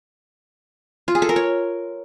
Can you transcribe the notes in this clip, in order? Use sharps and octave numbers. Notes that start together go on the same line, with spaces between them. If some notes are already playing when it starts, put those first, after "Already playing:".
F4
G#4
A4
A#4
C#5